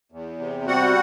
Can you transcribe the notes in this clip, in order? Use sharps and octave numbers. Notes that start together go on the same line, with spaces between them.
E2
C3
G3 F#4 F#5